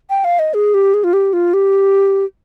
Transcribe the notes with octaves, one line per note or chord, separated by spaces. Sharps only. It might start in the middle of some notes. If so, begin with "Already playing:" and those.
G5
F5
D#5
G#4
G4
G#4
F4
G4
F4
G4